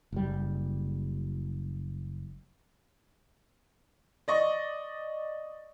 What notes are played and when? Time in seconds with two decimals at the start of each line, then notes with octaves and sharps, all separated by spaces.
0.12 F#1 G3
4.28 D5 D#5 C#6